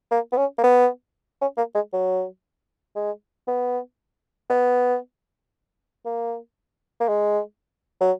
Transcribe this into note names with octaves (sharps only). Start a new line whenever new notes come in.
A#3
B3
C#4
A#3
B3
C#4
A#3
G#3
F#3
G#3
B3
B3
A#3
A#3
G#3
F#3